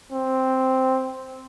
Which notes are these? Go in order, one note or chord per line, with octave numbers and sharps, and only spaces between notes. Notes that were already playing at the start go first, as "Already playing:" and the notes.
C4